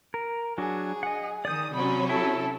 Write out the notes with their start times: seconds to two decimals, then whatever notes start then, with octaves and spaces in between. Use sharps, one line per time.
0.14 A#4
0.58 F#3 D4 F#4 G#4
1.03 D#5 F#5
1.45 D#3 D5 D#6 G6
1.74 C3 F#3 C#4 B5
2.09 E4 A4